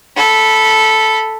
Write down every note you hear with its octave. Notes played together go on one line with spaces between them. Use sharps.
A4 B5